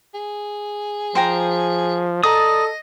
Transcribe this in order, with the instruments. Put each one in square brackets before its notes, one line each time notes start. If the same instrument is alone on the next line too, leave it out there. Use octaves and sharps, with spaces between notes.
[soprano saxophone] G#4
[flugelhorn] F3 [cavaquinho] C5 G5 A#5
[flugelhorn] A4 [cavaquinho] D5 A#5 [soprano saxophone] D#5 [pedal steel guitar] D#6